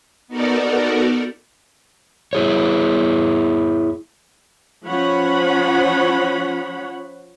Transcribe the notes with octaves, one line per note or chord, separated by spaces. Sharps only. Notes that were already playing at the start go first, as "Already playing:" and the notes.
B3 D#4 F#4 A4 A#4 D5
E4 G#4 C#5
F3 C#4 C#5 F#5 B5